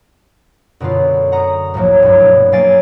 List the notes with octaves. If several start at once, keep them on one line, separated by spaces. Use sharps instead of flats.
F#2 B2 D3 B3 F4
F#5 A#5 D#6
C2 A2 F3 F#3 A#3
G2 A#2 F#3 A3 E4
B2 B3
F#3 A#3 F5 G#5 A6 D7